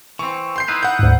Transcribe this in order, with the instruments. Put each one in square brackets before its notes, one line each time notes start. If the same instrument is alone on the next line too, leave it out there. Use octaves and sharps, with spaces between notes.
[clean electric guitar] E3 C4 [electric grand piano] C#6
[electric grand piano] C6 G6 C7
[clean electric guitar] D#4 E4 B4
[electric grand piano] F#5 G6
[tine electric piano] D2 G#2